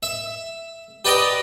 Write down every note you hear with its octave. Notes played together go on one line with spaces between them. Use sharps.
E5
G4 B4 D5 D#5 G5 A#5